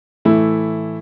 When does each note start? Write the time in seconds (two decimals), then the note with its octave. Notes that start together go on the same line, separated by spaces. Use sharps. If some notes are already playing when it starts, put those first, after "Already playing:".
0.25 A2 E3 A3 E4